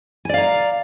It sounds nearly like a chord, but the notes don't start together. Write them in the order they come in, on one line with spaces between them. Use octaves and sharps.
G#5 D5 F5 A#5